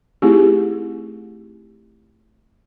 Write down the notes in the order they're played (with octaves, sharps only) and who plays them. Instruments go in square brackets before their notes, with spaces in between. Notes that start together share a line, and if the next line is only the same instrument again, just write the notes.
[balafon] A3 C4 D#4 E4 G4 G#4